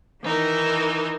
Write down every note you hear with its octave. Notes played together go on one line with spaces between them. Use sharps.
D#3 E3 D#4 A#4